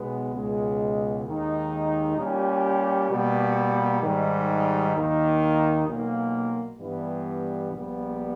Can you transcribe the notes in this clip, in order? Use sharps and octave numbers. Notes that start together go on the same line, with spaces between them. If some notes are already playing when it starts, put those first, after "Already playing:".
Already playing: B1 B2 G#3 B3
C#2 B2 G#3
D#2 D#3 G#3 D#4
A#2 G3 C#4 G4
B2 G3 A#3
G#2 D#3 G3
D#2 D#3 A#3 D#4
B1 A#2 A#3
G2 E3 G3 B3
A#1 A#2 G3 B3